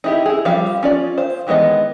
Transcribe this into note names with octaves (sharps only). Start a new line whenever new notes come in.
D#4 E4 G4
E4 G#4
F3 G3 F5
C#4 F4 D5
C5 F5
D#3 E3 G#3 B3 D#5